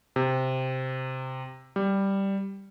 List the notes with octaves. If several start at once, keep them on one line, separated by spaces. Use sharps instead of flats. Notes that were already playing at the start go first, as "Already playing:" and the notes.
C3
G3